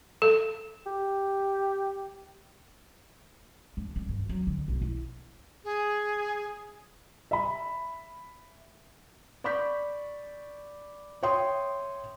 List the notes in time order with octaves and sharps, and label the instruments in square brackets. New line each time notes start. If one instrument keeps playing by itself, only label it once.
[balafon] A4
[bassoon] G4
[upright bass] D4
G3
G2
F#3
D3
B1
E4
[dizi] G#4
[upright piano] E5 B5
[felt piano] D5 B5 C#6 G6 B6
C#5 E5 G5 C6 D#6